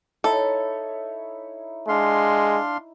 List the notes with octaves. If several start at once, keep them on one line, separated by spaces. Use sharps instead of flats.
D#4 E4 A4 C#5
G#3 D4 F5 C6